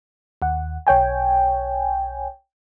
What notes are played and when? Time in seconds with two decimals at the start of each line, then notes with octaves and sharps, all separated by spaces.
0.42 D#2 F#5
0.87 B1 C#5 G5 G#5